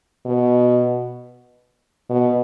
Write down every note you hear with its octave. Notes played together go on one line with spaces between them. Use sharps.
B2
B2